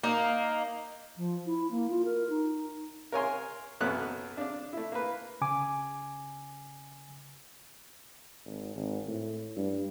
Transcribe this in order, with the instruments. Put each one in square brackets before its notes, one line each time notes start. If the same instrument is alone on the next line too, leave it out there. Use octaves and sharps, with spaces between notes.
[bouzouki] A#3 D#4
[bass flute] F3
E4
A#3
F4
A#4
D#4
[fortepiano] A#4 C#5 G#5 C6
B1 F#2 B3 A4 C#5 F#6
D4 D5
A3 E4
A#3 B4
[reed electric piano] C#3 G#5 D6
[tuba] G#1
G#1
A2
G2